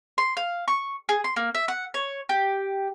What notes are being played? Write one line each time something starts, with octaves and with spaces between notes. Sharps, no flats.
C6
F5
C#6
G#4
C6
A#3
E5
F#5
C#5
G4